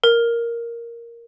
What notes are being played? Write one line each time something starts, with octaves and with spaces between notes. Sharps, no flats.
A#4